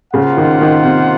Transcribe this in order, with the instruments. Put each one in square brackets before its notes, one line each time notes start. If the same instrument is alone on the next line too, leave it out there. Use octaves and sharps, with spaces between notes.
[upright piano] C#3 [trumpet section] A#3 F4 C5 F#5
[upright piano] D#3
D#3
C3